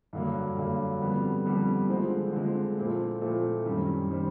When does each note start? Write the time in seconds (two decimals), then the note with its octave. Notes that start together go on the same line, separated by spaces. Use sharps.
0.13 G2 D3 F#3 A#3
0.57 G2 D3 F#3 A#3
1.01 F2 D3 G3 B3
1.46 F2 D3 G3 B3
1.89 D3 F3 G#3 C4
2.33 D3 F3 G#3 C4
2.78 A#2 F3 A3 C4 E4
3.21 A#2 F3 A3 C4 E4
3.66 F#2 D#3 G3 C4
4.10 D#3 G3 C4